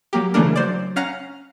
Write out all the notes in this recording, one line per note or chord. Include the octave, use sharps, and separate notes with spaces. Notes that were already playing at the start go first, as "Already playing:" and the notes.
F#3 A#3 G4
C#3 E3 A3 A#3 D4 A#4
F#3 C5 D5
C#4 F5 F#5 A#5